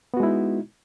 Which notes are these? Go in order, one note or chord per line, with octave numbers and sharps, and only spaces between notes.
G#3 B3 D#4 E4 F#4